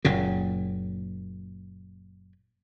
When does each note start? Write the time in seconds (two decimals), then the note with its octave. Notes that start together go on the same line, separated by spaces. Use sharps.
0.05 F#1 A#2 C#3